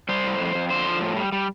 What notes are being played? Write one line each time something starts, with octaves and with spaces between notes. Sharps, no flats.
G3 C5
A2
F2
F2
D3 C5
F3
A2
G3
G3